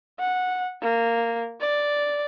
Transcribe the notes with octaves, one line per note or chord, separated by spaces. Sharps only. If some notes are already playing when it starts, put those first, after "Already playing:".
F#5
A#3
D5